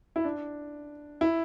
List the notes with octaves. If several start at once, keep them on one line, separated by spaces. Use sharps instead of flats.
E4
D4
E4